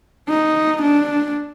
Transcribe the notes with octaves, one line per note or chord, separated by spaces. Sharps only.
D#4
D4